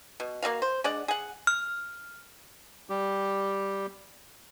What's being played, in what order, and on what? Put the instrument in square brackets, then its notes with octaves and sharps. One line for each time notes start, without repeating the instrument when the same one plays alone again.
[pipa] B2
A#3 C#4 F#4 F5
C5
G#3 D4 D5 F#5
G#4 F#5
[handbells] F6
[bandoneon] G3 G4